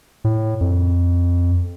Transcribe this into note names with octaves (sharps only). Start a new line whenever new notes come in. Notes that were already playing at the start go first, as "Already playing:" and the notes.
A2
F2